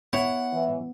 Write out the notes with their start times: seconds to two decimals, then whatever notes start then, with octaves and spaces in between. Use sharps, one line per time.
0.13 B3 E4 C#5 F#5
0.53 E3